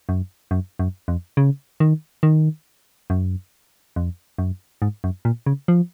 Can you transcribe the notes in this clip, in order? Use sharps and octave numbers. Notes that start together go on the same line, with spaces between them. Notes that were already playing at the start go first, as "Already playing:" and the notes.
F#2
F#2
F#2
F2
C#3
D#3
D#3
F#2
F2
F#2
G#2
F#2
A#2
C#3
F3